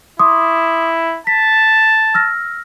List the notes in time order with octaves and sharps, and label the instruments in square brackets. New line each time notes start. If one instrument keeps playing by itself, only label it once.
[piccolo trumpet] E4 [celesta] C6 D6 D#6
[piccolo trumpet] A5 [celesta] B6
[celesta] E6 F6 A#6